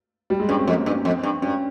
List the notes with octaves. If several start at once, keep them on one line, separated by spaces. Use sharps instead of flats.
G3
G#3
G2 C#4
C4
F2 A#3
G2 C#4
F2 C4
G2
G2 C#4